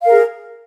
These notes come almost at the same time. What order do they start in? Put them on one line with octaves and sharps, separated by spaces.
F5 A#4 G#4